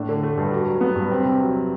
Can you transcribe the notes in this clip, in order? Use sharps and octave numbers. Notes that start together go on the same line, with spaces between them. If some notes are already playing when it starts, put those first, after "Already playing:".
Already playing: A2 D4
D3
A3
G2
F#4
F#3
B3
G2
C4
C3
F#3